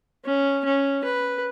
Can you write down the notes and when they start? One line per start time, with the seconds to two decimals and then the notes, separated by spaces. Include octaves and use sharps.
0.25 C#4
0.65 C#4
1.04 B4